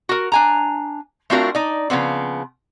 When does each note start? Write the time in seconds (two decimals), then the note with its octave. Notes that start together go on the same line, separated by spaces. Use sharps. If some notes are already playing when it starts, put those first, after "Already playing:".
0.09 F#4 A#4
0.32 D4 G#5 A#5
1.30 A3 C4 D4 F4 F#4 A#4
1.55 D#4 D5
1.90 C#3 F3 B3 C4